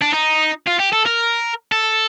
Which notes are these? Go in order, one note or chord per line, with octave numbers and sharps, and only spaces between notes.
D4
D#4
F4
G4
A4
A#4
A4